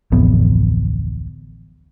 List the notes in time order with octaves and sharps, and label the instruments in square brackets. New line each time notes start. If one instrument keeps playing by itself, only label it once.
[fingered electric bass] D1 A1 F2 B3